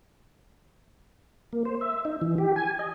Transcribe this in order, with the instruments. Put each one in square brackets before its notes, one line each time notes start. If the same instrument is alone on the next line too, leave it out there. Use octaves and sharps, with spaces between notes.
[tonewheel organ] A#3
C5
E5
D#4
E3
G4
G#5
D#5